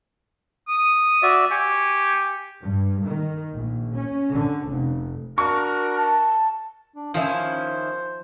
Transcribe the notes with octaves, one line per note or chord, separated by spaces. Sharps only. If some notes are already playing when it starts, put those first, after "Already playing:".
D#6
F#4 D5 E5
G4 G#5 C#6
G2
D#3
A#1
C#4
D3
F1
D4 F#4 A#4 C#6
A5
D4
D#3 F3 C#4 E4 C5